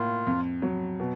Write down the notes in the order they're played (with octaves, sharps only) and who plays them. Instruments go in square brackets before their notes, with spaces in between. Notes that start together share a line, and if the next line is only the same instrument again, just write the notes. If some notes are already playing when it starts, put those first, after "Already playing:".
Already playing: [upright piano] A2 A#3 [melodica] F4
[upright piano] F2
F#3
B2